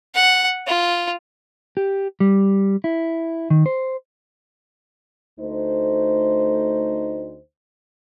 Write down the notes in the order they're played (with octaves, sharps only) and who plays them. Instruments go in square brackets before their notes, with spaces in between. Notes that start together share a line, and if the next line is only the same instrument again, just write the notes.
[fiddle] F#5
F4
[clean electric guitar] G4
G3
E4
D#3
C5
[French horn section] D2 A3 D#4 C5